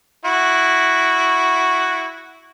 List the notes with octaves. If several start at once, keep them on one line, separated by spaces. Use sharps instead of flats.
E4 F#4